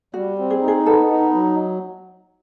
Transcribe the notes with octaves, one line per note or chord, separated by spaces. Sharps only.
G3 F#4
C4
G#4
D#4
G#4
B3 A4
D#4
F#3